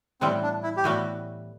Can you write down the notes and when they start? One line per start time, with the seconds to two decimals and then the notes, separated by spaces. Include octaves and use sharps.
0.21 A2 E3 G3 B3 C4
0.43 D4
0.63 E4
0.77 G4
0.84 A2 E3 G3 B3 F#4